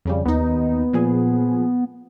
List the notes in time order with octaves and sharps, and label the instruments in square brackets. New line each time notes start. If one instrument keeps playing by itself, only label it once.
[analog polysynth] F2 C#3 G3
[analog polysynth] D#2 D#4 [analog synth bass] B3
[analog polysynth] A#2 F3 G#4